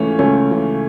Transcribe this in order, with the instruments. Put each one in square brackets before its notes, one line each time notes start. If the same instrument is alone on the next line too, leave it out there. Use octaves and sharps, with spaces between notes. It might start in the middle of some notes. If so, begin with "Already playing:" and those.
Already playing: [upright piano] C#2 C#3 E3 [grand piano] A3 C#4
[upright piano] C#2 [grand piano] A3 C#4
[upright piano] C#3 E3